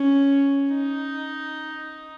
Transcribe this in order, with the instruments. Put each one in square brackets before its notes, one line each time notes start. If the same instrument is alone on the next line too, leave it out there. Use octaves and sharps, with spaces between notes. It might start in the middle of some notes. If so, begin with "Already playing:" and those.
Already playing: [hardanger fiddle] C#4
D#4